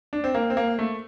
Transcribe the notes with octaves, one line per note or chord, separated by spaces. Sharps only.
D4
C4
A#3
C4
A#3
A3